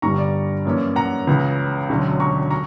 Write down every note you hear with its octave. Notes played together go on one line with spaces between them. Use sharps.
G1 G2 D3 G3 A#5 C#6
D5
F#2 E3 A#3 C#4
F#5 A#5
C#2 C#3 E3
E1 D2 D3 F#3 C#4
A#5 C#6
A#5 C#6